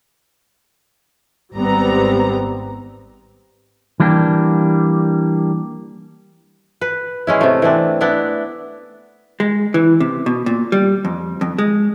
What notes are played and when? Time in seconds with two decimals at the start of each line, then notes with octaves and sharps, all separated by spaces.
1.57 G#1 G3 B3 C4 A#5
4.00 E3 G3 A#3 D4 G4
6.81 B4
7.27 G#3 C#4 E4
7.41 C3 A3
7.62 E3 C4 D4
8.01 B3 D4 E4
9.40 G#3
9.74 E3
10.00 C3
10.26 B2
10.46 A#2
10.72 G3
11.05 F2
11.41 F2
11.58 G#3